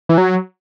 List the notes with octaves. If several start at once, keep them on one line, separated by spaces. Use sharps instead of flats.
E3
F#3